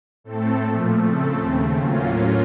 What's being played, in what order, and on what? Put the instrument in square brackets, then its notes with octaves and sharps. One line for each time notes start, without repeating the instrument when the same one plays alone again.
[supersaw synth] A2 A3 C4 A4
A#2 F3 A3
C#3 A3 C4 A4
D#2 C#3 A3 C4
A2 F#3 A#3 C#4 F4